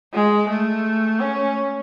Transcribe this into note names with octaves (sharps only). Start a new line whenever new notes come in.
G#3
A3
C#4